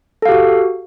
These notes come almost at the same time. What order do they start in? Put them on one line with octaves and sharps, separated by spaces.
A4 F5 G4 F#4